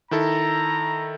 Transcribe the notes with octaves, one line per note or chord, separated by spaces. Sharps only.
D#3 E4 A4 A#5